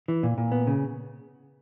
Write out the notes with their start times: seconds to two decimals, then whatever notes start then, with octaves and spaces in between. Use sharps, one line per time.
0.08 E3
0.23 A#2
0.38 A#2
0.52 B3
0.67 C#3